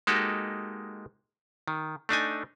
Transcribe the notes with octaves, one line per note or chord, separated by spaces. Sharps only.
G#3 A#3 D#4 F#4 G4 A4
D#3
A3 D4 D#4 G#5